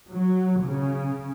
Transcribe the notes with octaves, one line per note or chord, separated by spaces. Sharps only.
F#3
C#3